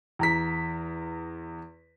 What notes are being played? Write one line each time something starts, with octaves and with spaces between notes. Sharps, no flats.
E2 A#5 B6